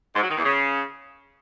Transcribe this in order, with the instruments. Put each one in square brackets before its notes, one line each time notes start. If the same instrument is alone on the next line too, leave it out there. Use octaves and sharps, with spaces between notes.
[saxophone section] G#2
F#3
D#3
E2
C#3